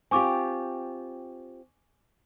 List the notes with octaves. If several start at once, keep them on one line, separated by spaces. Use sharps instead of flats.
C4 F4 G4 G#5 C#6 D6